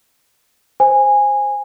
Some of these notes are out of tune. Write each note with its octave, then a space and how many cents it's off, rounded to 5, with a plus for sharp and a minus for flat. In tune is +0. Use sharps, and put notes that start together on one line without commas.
C5 +5 G#5 -15